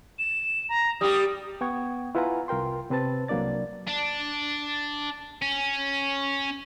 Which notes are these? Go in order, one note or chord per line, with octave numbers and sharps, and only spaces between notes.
E7
A#5
G3 G4 D#6
B3 F#5 G5 C#6 G#6
E4 F4 B4 F#5 G#5 A#5
C2 F4 A#4 G5 C6
C3 C4 B4 A5 A6
C2 F#3 A#3 D4 D5 A6
D4
C#4